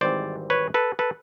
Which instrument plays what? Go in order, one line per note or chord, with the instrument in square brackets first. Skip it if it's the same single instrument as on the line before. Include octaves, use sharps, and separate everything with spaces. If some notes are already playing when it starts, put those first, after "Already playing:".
[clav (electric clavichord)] G#1 G#2 E3 G3 C4 C5 D5
B4 C#5
A4 B4
A4 B4